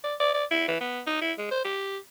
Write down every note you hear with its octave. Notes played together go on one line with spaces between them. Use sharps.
D5
D5
D5
E4
E3
B3
D#4
E4
G#3
C5
G4